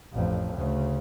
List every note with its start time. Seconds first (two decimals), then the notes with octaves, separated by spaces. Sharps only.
0.13 A1 F2
0.56 D2 C#3